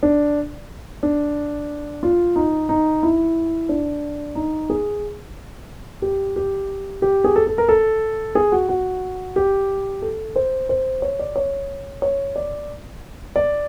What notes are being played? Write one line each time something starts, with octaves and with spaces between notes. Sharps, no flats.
D4
D4
F4
D#4
D#4
E4
D4
D#4
G#4
G4
G4
G4
G#4
A4
A4
A#4
A4
G#4
F#4
F#4
G4
A4
C5
C5
C#5
D5
C#5
C#5
D5
D5